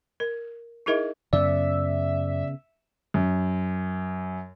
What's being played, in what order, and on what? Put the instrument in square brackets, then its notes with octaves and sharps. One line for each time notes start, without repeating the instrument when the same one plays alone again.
[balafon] A#4
D#4 E4 G#4 A#4 D#5 E5
[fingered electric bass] F#2 [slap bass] C#3 B3 [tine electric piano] D5 [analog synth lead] E5
[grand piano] F#2